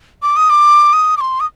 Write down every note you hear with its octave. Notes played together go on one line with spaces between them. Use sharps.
D6
D#6
D6
D#6
D6
C6
D#6